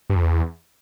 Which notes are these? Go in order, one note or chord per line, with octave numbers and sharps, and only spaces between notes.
G2
F2
E2